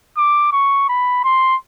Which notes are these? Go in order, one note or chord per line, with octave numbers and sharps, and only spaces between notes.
D6
C#6
B5
C6